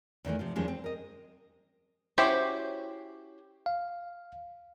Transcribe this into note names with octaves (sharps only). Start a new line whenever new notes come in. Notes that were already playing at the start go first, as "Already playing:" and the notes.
E2 D#3 E3 A3
C3 F3 F4
E2 D#3 F3 G3 G#3 C#4
C4
A#4 D#5
C#4 E4 F#4 G4 C5
F5